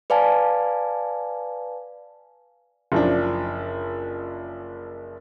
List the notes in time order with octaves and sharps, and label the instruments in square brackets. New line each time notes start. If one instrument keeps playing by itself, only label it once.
[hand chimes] B4 D5 F5 G#5 A5
[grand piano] F#1 F3 D4